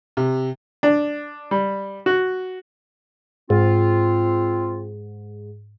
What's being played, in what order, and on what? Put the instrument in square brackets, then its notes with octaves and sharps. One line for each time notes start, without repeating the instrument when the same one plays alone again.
[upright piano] C3
[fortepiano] D4
G3
F#4
[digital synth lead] G#2 [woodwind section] C4 F4